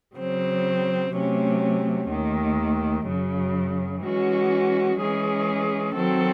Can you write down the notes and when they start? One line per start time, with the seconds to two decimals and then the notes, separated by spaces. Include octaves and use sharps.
0.15 C#3 F#3 C4
1.12 C3 F#3 A3 C#4
2.09 D#2 D#3 A3
3.06 F#2 C#3 F#3
4.01 E3 G#3 C#4 F#4
4.99 E3 G#3 C#4 G#4
5.95 D#3 F#3 C4 F#4 A4